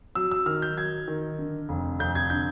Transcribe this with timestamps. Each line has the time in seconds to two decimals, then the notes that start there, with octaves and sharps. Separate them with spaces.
0.15 F#3 E6
0.31 E6
0.46 D#3 F6
0.62 G6
0.77 F#3 G#6
1.08 D#3
1.39 D3
1.69 F1
1.99 F1 G6
2.15 G#6
2.30 D3 G6